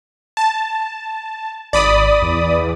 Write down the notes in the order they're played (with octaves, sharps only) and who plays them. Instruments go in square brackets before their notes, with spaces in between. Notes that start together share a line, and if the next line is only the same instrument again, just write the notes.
[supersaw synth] A5
[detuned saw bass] G#1 [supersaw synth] D5 B5 D#6
[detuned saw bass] E2